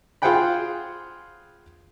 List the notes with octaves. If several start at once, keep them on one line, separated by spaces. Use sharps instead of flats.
F4 G#4 C5 F#5 G5 B5